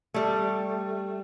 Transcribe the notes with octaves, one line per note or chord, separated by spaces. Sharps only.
G3 A3